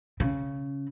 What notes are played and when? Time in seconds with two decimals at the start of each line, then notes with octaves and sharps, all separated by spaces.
0.20 C#3